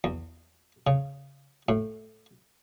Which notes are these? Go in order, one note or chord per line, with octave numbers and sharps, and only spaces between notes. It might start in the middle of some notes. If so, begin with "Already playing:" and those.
E2
C#3
A2